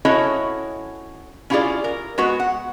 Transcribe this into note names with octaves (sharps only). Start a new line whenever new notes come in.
C#4 E4 F#4 A4 C#5 D#5
C#4 E4 F4 G4 G#4 D5
A#4
G#3 B3 F#4 B4
F#5